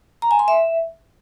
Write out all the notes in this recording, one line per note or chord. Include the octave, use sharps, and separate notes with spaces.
A#5
G#5
C6
E5